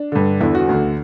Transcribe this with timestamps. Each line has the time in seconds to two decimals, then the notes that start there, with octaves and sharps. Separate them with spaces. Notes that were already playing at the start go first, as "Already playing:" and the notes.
Already playing: D4
0.12 G2 D3
0.41 E2 D3 E4
0.55 F#4
0.69 D2 D3